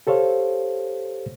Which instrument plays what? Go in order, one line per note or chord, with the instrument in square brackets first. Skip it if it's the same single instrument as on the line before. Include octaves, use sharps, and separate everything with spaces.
[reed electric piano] G4 A4 C5 C#5 F5